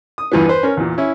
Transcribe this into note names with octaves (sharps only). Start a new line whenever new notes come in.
D#6
E2 G2 E3 F3 B3
B4 C5
C#4 A#4
E2 A#2
C#4 E4